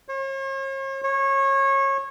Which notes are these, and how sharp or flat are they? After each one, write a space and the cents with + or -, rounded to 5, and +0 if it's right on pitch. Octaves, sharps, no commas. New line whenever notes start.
C#5 -45
C#5 -25